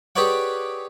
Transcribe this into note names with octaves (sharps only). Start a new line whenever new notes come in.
G4 G#4 B4 C#5 D5 F#5